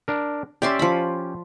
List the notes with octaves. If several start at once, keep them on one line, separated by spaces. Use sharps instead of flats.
D4 A#4
C#4 G4 D5 E5 C6
F3 B5